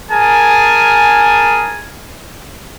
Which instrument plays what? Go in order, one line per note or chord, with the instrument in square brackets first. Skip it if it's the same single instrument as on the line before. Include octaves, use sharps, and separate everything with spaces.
[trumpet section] G#4 A#4 G#5 A5